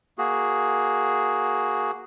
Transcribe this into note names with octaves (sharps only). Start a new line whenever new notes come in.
A#3 F#4 G#4